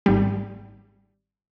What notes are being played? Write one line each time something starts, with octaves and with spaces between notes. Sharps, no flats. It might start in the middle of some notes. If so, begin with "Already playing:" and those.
G#1 G3